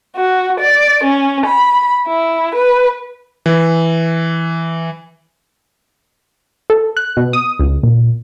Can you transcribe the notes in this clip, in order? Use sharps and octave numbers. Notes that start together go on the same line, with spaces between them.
F#4
D5
C#4
B5
E4
B4
E3
A4
F#6
B2
D#6
C#2
A#2